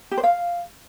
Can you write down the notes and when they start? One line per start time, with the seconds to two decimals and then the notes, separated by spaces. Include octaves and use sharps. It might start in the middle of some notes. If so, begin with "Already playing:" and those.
0.11 G4
0.17 C5
0.23 F5